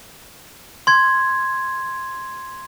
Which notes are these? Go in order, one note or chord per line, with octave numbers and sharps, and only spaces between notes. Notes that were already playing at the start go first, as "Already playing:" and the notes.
C6 G#6